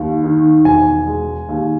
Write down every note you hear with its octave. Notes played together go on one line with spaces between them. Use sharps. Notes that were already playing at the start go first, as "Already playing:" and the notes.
Already playing: D#2
D#3
E1 G#5
G#3
D#2